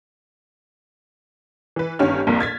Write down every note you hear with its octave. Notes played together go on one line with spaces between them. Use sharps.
E3 B4
G1 G2 D#3 C#4 G4 F6
A#1 F2 A#2 A#4
F6 G#6 A6 B6